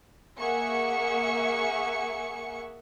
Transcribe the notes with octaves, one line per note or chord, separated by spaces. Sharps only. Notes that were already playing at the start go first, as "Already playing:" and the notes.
A#3 G#4 E5 F#5 C#6 C#7